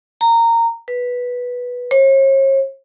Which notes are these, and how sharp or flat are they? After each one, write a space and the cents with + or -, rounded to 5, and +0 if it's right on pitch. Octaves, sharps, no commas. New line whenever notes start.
A#5 -15
B4 -5
C#5 -45